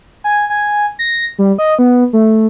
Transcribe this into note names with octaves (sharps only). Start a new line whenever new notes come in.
G#5
G#5
A#6
G3
D#5
B3
A3